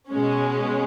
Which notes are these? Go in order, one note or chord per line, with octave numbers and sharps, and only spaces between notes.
B2 G#3 C#4